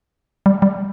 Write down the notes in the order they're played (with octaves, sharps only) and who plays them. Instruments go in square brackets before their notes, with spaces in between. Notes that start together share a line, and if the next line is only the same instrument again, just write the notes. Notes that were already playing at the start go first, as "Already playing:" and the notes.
[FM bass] G3
G3